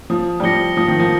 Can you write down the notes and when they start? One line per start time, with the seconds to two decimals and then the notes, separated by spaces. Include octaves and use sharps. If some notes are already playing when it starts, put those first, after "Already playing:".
0.10 F3 D#6
0.40 G3
0.43 F3 A#6 C#7 G7
0.77 F3 D#6
0.88 D#3
1.00 F3